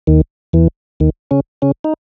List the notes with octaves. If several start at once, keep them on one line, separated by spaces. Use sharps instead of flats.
D#2 D#3
E2 E3
D#2 D#3
C#3 C#4
C#3 C#4
D#4